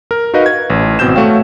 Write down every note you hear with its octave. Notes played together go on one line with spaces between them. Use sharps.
A#4
D#4 F#4 A#4 B4 D#5 F5
G#6
A1
G#1 B2 C4 G6 E7
A3 F#4 C#5 F5 G5